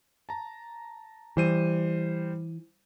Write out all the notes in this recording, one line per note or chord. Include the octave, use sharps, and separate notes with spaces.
A5 A#5
E3 G3 C5 D#7